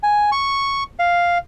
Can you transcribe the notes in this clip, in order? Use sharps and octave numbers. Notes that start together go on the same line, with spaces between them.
G#5
C#6
F5